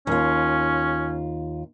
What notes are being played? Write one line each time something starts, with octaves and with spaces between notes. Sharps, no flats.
D#2 C#4 F4